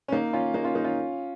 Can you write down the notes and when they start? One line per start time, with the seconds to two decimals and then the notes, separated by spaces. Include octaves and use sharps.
0.08 C#4
0.12 A#3 D#4
0.33 C#4 F4
0.54 A#3 D#4
0.64 C#4 F4
0.75 A#3 D#4
0.84 C#4 F4